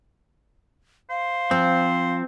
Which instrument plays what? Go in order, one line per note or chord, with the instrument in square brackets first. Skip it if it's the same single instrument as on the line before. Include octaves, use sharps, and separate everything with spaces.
[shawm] C5 [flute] F5
[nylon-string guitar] F3 [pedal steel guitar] C4